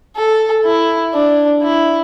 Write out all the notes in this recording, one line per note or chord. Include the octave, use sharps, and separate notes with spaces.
A4
E4
D4
E4